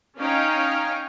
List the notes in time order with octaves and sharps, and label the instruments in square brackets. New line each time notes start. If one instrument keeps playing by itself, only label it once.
[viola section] C#4 D#4 C#5 F5 G5 A#5